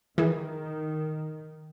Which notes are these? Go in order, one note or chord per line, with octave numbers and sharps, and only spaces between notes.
D#3 E3 G#4